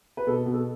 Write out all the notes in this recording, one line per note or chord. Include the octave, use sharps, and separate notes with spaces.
B4
B2 A4
B2
A4